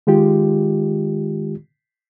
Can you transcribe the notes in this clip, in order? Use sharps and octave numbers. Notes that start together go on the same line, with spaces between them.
D#3 G#3 F4 G4